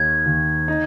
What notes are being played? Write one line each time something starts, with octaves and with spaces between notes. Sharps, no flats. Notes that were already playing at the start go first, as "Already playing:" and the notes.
Already playing: D#2 D#3 D#4 G#6
D#2
D#4